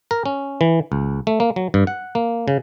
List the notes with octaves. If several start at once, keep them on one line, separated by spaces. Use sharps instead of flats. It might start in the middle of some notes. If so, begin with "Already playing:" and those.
A#4
C#4
E3
C#2
A3
A#3
F#3
G2
F#5
A#3
C#3